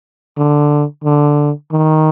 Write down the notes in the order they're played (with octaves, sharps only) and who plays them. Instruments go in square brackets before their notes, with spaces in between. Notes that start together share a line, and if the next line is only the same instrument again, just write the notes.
[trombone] D3
D3
D#3